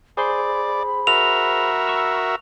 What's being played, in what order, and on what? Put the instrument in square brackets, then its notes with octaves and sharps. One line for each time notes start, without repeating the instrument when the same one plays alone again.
[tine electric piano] G#4 C5 C6 [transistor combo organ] D5 [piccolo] B5
[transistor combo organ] F#4 A#4 E5 [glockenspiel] F7
[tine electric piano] C#6 E6